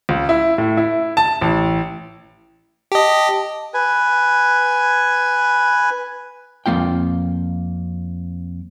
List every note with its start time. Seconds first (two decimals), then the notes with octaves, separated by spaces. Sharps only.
0.09 C#2
0.29 E4
0.58 A2
0.77 E4
1.17 A5
1.41 A1
2.92 G4 D#5 A5
3.74 B4 G#5
6.66 F2 F3 A#3 F4 G5